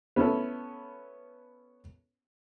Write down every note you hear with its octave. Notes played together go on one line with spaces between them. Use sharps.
B3 C#4 E4 A4